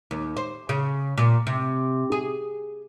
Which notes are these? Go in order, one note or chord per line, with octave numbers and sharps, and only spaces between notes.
D#2
C5
C#3
A#2
C3
G#4